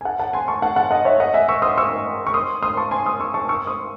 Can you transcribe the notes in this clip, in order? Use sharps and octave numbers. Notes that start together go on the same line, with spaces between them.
G#5
F#5 A5
F#5 A5
G#5 C6
A5 C#6
F#5 A5
F#5 A5
D#5 F#5
C#5 E5
D#5 F#5
E5 G#5
C#6 E6
C6 D#6
C#6 E6
C#6
C6 D#6
C6 D#6
A5 C#6
G#5 C6
C6 D#6
C#6 E6
A5 C#6
C#6 E6
C6 D#6